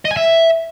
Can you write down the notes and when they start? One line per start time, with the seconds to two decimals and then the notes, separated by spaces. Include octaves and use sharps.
0.05 D#5
0.11 G#5
0.17 E5